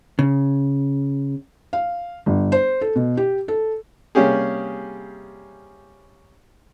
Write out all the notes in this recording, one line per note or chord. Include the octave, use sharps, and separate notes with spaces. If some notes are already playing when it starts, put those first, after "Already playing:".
C#3
F5
G1
C5
A4
B2
G4
A4
C3 G3 A#3 C#4 G4 G#4